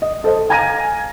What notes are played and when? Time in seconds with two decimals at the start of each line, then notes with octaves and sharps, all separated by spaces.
0.02 D#5
0.24 A4 C5 D#5
0.49 F5 G#5 A#5 G#6 A#6 D#7